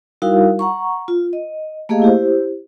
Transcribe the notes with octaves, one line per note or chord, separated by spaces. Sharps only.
G3 D#4 E4 F#4 A#4 F5
F#5 A#5 C#6
F4
D#5
A3 A#3 G4 G#4 D#5 F5
E4 G4 C5